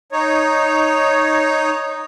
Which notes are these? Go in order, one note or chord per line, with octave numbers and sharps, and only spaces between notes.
D#4 C#5